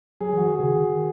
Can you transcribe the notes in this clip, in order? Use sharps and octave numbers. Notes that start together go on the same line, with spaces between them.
F#3 G#4
E3 F#4
D#3
C#3 G#4
D#3